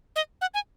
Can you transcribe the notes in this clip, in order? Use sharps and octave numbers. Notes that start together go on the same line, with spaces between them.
D#5
F#5
G#5